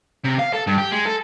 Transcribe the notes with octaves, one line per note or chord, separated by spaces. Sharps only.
C3
F5
A4
G2
G4
G#3
A4